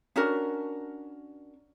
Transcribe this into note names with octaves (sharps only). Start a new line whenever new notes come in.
C#4 D4 F#4 A#4